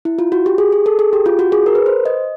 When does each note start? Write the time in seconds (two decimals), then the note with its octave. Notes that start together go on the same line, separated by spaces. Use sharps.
0.05 E4
0.19 F4
0.32 F#4
0.46 G4
0.58 G#4
0.72 G#4
0.86 A4
0.99 G#4
1.13 G4
1.26 F4
1.39 F#4
1.52 G#4
1.66 A#4
1.75 B4
1.86 C5
2.05 D#5